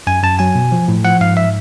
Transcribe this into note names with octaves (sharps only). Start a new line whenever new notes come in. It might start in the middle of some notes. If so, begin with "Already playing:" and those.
F#2 G#5
F#2 A5
F#3 G#5
B2
F3
A2
F3 F#5
G#2 F5
E5